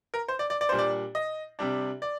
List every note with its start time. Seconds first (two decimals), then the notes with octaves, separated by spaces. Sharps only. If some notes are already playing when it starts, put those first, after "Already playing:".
0.14 A#4
0.28 C5
0.39 D5
0.50 D5
0.61 D5
0.69 A#2 G3 D4 C5
0.79 D5
1.15 D#5
1.59 C3 G3 D4
2.02 D5